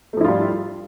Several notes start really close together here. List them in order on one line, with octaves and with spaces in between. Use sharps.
A3 F3 E4 F4 G3